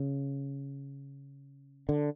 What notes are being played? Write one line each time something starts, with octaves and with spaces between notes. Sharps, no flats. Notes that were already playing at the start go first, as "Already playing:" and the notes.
Already playing: C#3
D3